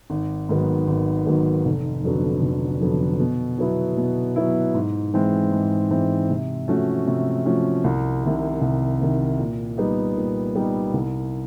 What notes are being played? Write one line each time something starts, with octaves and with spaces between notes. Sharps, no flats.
G#1
G#2 D#3 F#3 B3
G#1
G#2 D#3 F#3 B3
F1
F2 D3 F#3 B3
F1
F2 D3 F#3 B3
B2
F#3 B3 E4
B2
F#3 B3 E4
G#2
E3 G#3 C4
G#2
E3 G#3 C4
C3
F3 A3 C#4 F#4
C3
F3 A3 C#4 F#4
C2
C3 D#3
C2
C3 D#3
A#2
G3 B3 D#4 G4
A#2
G3 B3 D#4 G4
C2